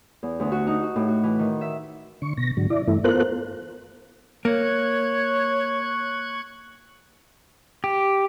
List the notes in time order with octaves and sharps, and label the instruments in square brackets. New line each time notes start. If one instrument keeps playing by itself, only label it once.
[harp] E2
D2
F#4
D#4
F#4
A2
F#4
E3
D#3
E5
[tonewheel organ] D3 C#6
B2 A#6
G#2 D3 F#3
E4 D5
G2 E3 A3 E4
B3 F4 A4 A#4 C5 F#6
[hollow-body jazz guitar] A#3 [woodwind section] C#5 [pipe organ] C#6 F#6 G#6
[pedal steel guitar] G4